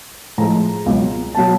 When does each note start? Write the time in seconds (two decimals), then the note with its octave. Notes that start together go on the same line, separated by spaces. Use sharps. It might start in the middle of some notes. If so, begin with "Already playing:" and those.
0.38 A2 F3 G#3 A#5
0.86 C#2 B2 F#3
1.35 B2 F#3 A5